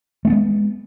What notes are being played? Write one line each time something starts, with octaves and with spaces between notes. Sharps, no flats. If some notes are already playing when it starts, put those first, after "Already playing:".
G#3 A3 B3 C#4